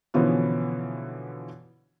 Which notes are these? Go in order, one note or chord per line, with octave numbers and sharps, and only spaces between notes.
B2 D3 E3 F3 B3 C#4